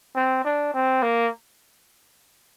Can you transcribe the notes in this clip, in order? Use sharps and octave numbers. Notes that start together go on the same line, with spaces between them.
C4
D4
C4
A#3